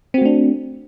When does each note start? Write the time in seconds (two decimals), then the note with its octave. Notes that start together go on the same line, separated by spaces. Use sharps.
0.14 C4
0.18 F#4
0.22 A3
0.25 D4